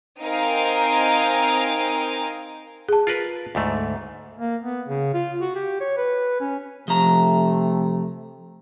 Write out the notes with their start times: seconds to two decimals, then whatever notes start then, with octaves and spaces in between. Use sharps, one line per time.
0.22 C4 D#4 A#4 F5 G5 G#5
2.89 G#4 A5
3.07 F4 A#4 B4
3.55 D2 G#2 A3
4.38 A#3
4.62 B3
4.88 C#3
5.14 F4
5.41 F#4
5.56 G4
5.80 C#5
5.97 B4
6.40 C#4
6.88 C3 F3 A3 A#5